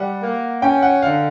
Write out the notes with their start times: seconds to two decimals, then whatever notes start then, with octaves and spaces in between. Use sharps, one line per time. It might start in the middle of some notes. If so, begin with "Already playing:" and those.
Already playing: G3 F#5
0.22 A#3
0.62 C#4 G5
0.82 F#5
1.02 D3 F5